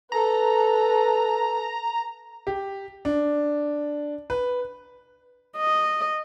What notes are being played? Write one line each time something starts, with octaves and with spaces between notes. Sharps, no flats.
A4 B4 A#5
G4
D4
B4
D#5